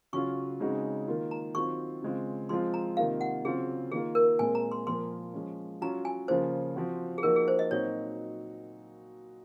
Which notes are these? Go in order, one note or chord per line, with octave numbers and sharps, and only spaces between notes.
C#3 F#3 C#4 F4 C#6
C#3 G#3 C4 D#4 F#4
D#3 A#3 F4
A#5
D#3 F#3 C4 F4 C#6
C#3 G#3 C4 F4
F3 G#3 C4 F4 C6
A#5
C3 D#3 A#3 F4 F5
F#5
C#3 F#3 C4 F4 G#4
D#3 A#3 F4 G#4
A#4
A#2 G#3 C4 G#5
A#5
C6
A#2 F3 A#3 C6
F3 G#3 C#4
F#3 C#4 F4 A#5
G#5
C#3 F3 A#3 F4 C5
F3 C4 F#4
G#4
F3 A#3 D#4 F#4 A#4
G#4
C5
D#5
A#2 F#3 C4 D#4 F#4 C#5